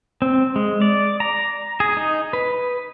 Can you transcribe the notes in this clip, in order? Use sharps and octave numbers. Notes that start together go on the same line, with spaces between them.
C4
G#3
D5
A#5
G#4
D#4
B4